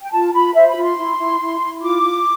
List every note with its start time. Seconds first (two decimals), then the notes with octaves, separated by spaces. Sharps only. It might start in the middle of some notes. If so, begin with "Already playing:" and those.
0.02 G5
0.12 F4 A5
0.33 F4 B5
0.54 C5 E5
0.68 B5
0.75 F4
0.82 C6
0.96 E4
1.18 E4
1.39 E4
1.60 E4
1.81 F4 D6
2.02 F4